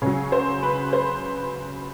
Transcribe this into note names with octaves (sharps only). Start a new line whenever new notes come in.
C#3 F#3 C#5
C5
B4
C5